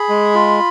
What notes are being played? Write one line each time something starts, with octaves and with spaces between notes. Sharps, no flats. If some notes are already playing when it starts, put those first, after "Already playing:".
Already playing: G#4 B5
G#3
F4